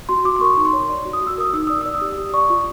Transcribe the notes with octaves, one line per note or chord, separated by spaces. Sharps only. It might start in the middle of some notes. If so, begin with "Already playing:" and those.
F#4 C6
F#4 D6
C6
A#4 C#6
D#4
C6
C#5
D5
F#4
D#6
F#4
E6
A#4 D#6
D#4 E6
D5 D#6
D5 E6
D#6
G4
G4
D5 C#6
F4